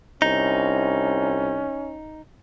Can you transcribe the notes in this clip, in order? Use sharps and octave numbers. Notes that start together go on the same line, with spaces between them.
C2 C#4 D#4